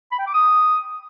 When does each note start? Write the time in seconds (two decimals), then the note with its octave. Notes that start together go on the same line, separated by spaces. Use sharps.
0.12 B5
0.19 G5
0.27 D6
0.34 D#6